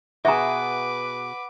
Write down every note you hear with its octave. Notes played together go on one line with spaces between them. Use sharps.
B2 G#4 B4 E5 F#5 A#5 D6